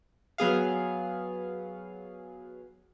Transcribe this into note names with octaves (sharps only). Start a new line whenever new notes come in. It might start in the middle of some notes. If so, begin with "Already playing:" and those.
F#3 B3 G#4 F5